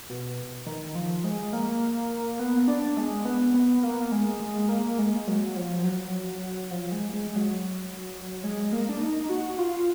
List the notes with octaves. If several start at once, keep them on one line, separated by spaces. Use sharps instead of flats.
B2
D#3
F3
G#3
A#3
B3
D4
G#3
B3
B3
A#3
G#3
G#3
A#3
G#3
F#3
F3
F#3
F3
G#3
G#3
F#3
G#3
A#3
D4
D#4
F#4
F4